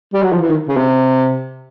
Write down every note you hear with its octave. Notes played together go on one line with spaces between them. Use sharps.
G3
F#3
F3
E3
D#3
C#3
C3